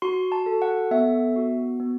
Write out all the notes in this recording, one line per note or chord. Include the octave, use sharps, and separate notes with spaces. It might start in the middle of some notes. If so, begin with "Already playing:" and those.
F#4 C6
A5
A4
F#5
B3 E5
F#4
B3